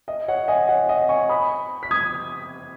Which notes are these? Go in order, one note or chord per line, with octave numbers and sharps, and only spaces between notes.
D#5
C#5 F#5
D#5 G#5
C#5 F#5
D#5
G#5 C#6
B5 D#6
B6
D#6 G#6